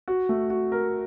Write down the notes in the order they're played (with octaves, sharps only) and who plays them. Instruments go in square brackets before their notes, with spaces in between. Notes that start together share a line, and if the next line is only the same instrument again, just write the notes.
[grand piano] F#4
A3
F#4
A#4